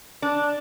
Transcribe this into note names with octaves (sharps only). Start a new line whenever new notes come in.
D4